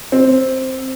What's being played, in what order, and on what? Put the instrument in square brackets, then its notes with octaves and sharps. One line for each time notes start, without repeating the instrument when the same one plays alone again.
[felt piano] C4